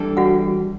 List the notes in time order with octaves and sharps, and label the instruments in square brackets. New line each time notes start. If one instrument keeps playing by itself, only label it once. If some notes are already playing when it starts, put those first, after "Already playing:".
Already playing: [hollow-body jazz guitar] E3 G3 D4 A4
[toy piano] F#4 F#5